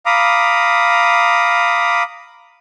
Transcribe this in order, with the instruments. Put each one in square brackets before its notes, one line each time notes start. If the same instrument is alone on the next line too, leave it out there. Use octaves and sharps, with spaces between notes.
[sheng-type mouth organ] F5 A#5 B5 D6 D#6